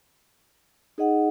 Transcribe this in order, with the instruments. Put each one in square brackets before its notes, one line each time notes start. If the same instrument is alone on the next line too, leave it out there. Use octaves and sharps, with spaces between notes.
[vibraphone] D#4 G#4 D#5 F#5